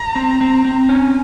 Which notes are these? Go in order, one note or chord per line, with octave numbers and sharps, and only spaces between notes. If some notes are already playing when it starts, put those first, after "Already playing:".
Already playing: A#5
C4
C4
C4
C#4 G#5